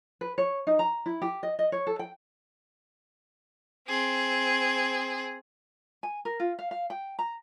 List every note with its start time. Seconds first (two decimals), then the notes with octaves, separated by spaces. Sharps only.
0.21 B4
0.38 C#5
0.67 D#4
0.79 A#5
1.06 E4
1.22 G4
1.43 D#5
1.59 D#5
1.72 C#5
1.87 A4
1.99 G5
3.88 C4 G#4
6.03 G#5
6.25 A#4
6.40 F4
6.59 F5
6.71 F5
6.90 G5
7.19 A#5